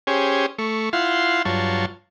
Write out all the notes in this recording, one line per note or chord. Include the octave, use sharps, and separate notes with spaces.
C#4 G4 G#4 C5 C#5
A3 C#6
E4 F4 F5 F#5 C6
G2 F#3 F4 C#5 A5